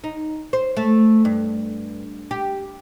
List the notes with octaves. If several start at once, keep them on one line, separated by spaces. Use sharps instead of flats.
D#4
C5
A3
G2
G4